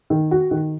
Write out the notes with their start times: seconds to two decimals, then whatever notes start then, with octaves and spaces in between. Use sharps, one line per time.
0.10 D#3
0.31 F#4
0.51 D#3